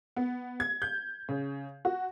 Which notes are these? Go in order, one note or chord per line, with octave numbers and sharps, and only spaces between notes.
B3
G#6
G6
C#3
F#4